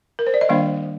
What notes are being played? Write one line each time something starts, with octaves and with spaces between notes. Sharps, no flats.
A#4
C5
D5
D#5
D#3 G3 A#3 D4 F5